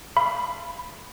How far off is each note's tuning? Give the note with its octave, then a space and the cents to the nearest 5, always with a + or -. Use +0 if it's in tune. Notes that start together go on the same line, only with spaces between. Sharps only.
F5 -25 B5 +5